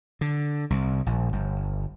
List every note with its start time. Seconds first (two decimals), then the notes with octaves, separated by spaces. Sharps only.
0.21 D3
0.70 C2
1.06 A#1
1.33 G1